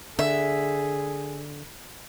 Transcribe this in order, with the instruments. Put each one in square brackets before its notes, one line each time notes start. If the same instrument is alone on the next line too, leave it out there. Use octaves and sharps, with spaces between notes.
[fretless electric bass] D3 [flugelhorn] G#4 [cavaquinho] E5